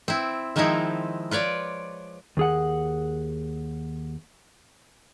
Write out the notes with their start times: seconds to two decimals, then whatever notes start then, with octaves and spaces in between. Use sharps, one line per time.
0.08 C4 E4
0.56 D#3 F3 G#3 C4 D#4 E4
1.31 F4 B4 C#5 D5
2.37 D#2 G#4 F#5